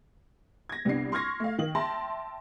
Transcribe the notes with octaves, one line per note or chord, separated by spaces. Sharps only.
G#6 A#6
C2 G3 B3 D4 C7
C6 C#6 F6 G#6 A#6 C7
A3 F5
D#3 F#7
E5 G5 A5 C6 A#6